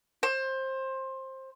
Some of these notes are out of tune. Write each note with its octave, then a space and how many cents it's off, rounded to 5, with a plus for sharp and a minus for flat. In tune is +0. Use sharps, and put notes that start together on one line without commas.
C5 +20